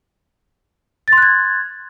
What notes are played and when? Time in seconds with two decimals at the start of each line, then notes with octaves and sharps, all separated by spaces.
1.08 A6
1.13 C6
1.17 F#6
1.22 G#6